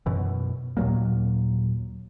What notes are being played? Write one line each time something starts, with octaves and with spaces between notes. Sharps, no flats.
F#2 B2 E3
D#2 A#2 F#3 A#3